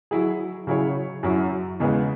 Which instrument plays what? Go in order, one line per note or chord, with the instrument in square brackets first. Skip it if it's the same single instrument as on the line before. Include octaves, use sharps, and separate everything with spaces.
[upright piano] F#3 E4 G#4
C#3 F#3 E4 G#4 C#5
F#2 F#3 E4
E2 C#3 G#3 B3 G#4